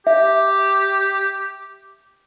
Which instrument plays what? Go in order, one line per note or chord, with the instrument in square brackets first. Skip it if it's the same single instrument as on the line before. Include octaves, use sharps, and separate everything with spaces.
[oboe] G4 [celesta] E5